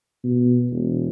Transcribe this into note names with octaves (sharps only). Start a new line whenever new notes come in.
B2
E1